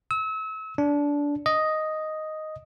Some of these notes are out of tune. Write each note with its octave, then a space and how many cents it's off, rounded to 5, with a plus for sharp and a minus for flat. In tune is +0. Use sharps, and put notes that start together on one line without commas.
E6 -35
D4 -20
D#5 +0